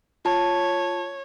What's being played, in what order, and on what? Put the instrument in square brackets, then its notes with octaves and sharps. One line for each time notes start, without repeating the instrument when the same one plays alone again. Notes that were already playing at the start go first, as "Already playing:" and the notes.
[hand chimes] F4 A5 [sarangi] C#5